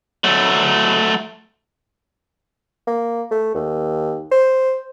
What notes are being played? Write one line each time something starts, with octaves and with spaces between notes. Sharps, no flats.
F#3 A3
A#3
A3
D#2
C5